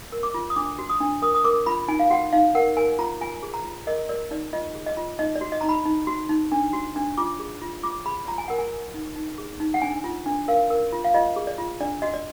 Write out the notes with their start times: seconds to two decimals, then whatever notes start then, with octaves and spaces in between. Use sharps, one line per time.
0.12 A#4
0.23 D6
0.34 F4
0.50 D#6
0.56 D4 D6
0.79 F#4
0.90 D#6
1.00 D4
1.22 A#4 D#6
1.35 D#6
1.44 A#4 D6
1.66 F4 B5
1.88 D#4 G#5
1.99 F5
2.10 F#4 F#5
2.33 D#4 F5
2.55 A#4 F#5
2.77 A#4 G#5
2.99 F4 A#5
3.21 F4 G#5
3.43 G#4
3.54 A#5
3.65 F4
3.87 A#4 D#5
4.09 A#4 D5
4.31 D#4 D5
4.53 F4 D#5
4.75 G#4
4.86 D#5
4.97 F4
5.19 D#4 D#5
5.35 D5
5.41 F#4
5.52 D#5
5.61 D#4 A#5
5.69 B5
5.85 D#4
6.07 F#4
6.29 D#4
6.52 D4
6.73 F#4
6.96 D4
7.18 F4 D6
7.39 G#4
7.62 F4
7.83 F4 D6
8.06 G#4 B5
8.28 F4 A#5
8.38 G#5
8.48 A#4 F#5
8.58 G#5
8.72 A#4
8.94 D#4
9.16 D#4
9.38 G#4
9.60 D#4
9.74 F#5
9.82 D4 G#5
10.04 F4
10.26 D4
10.48 A#4 F5
10.70 A#4
10.93 F4
11.04 F5
11.14 F4 D#5
11.36 G#4
11.47 D5
11.58 F4
11.80 D4 D5
12.02 F#4 D#5
12.14 D5